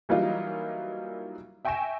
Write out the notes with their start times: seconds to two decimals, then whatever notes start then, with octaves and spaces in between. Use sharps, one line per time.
0.09 E3 F#3 G3 A#3 D#4 F4
1.65 E5 G5 G#5 C#6 A#6 E7